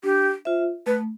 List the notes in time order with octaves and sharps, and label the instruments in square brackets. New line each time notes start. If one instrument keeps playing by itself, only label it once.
[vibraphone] D4 [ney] G4
[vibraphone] F4 C5 E5
[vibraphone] A3 [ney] B4